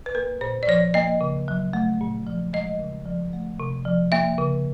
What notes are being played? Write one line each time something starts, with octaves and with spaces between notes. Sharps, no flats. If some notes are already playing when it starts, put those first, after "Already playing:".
B4
A#3 A#4
A#2 C5
D5
F3 C#5
A#3 D#5
C#3
F#3
A3
A#2
F3
G#3 D#5
C#3
F3
A3
C3
F3
A#3 E5
C#3